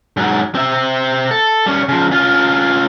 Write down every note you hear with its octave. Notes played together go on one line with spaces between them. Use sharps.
G#2 F#3
C4 E5
A4
G3 C#4
C#3 F3
C#4 F4